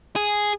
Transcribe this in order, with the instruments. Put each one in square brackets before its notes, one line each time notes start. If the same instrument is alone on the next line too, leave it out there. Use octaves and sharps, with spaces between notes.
[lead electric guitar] G#4